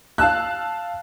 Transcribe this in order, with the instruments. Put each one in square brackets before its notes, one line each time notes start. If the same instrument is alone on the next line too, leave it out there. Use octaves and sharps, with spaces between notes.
[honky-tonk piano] F5 A5 E6 F#6